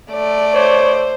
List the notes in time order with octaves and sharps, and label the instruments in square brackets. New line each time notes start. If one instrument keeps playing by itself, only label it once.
[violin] A3 D5
[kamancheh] C5 [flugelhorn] C#5